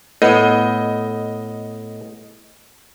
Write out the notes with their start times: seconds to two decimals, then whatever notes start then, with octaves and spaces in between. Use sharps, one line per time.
0.22 A2 B3 D#5